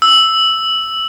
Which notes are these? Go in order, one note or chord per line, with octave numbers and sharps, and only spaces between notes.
E6